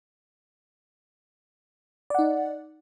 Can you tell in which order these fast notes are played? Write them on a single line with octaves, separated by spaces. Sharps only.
D5 F#5 D#4